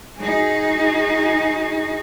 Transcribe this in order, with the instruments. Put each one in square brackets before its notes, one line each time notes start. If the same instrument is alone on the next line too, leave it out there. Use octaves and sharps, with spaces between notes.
[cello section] D#4 F#4 G#4